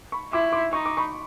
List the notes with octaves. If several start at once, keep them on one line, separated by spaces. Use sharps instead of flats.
B5 C#6
E4 C6 D6
C6 D6
D#4 C#6
D6
B5 C#6